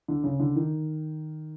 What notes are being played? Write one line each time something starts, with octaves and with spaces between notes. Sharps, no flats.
D3
C#3
D3
D#3